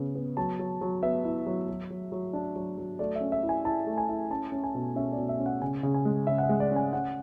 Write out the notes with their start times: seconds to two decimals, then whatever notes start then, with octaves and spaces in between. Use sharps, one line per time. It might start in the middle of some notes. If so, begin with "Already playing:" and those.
Already playing: C#3 B3
0.15 B3
0.37 F#3 A5
0.59 F#3
0.81 F#3
1.03 B3 E5
1.25 E4
1.46 F#3
1.69 F#3
1.90 F#3
2.12 F#3
2.33 D4
2.56 F#3
2.78 F#3
2.99 A3 D5
3.16 E5
3.21 C#4
3.32 E5
3.43 E4
3.49 G#5
3.65 E4 A5
3.87 A3
3.98 G#5
4.09 E4
4.30 C#4 A5
4.52 C#4
4.64 G#5
4.75 B2
4.96 C#4 E5
5.12 D5
5.18 B2
5.29 E5
5.39 C#4
5.46 F#5
5.61 C#3 G#5
5.83 C#3
5.94 G#5
6.05 G#3
6.27 C#3 E5
6.38 F#5
6.43 E5
6.49 G#3
6.60 D5
6.71 C#4
6.76 G#5
6.93 C#4 F#5